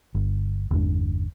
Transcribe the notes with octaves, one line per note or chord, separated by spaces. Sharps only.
G1
G1 E2 G#3 D4